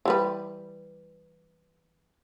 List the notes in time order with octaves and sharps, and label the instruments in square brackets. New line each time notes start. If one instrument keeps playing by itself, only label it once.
[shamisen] E3 G3 B4